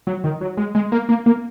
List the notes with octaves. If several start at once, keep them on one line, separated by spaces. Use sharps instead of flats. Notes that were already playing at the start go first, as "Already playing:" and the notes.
F#3
D#3
F#3
G#3
G#3
A#3
A#3
A#3